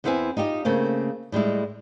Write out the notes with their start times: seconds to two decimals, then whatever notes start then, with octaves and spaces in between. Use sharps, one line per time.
0.04 E2 B3 C4 E4 B4 G#5
0.37 D#4 F4 G4 D#5
0.65 C#3 A3 A#3 C4
1.32 A2 G3 G#3 E4